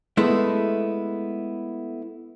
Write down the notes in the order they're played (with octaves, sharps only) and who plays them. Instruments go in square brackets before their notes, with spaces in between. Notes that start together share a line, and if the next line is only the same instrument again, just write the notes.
[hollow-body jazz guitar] G#3 A3 B3 E4